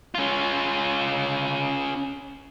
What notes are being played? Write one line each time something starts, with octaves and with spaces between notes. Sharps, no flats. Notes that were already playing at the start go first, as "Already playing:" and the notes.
C#4 F4